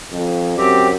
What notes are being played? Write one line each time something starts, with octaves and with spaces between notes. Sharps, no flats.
F2
F#2 C4 G4